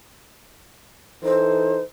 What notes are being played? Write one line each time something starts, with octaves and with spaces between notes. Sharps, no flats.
E3 D#4 A4 C5